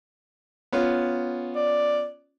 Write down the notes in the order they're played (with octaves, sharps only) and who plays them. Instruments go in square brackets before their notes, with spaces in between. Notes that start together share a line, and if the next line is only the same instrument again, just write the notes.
[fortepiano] B3 C#4 F4
[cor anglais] D5